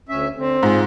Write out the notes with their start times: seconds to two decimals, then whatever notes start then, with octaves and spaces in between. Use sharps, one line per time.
0.09 D2 C#4 E5
0.35 D3 C4
0.63 G#2 F4 G#4